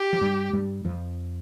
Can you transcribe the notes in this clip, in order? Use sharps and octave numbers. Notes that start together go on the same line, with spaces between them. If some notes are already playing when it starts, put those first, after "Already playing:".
Already playing: G4
F3
G2 G3
G2 G3
F2 F3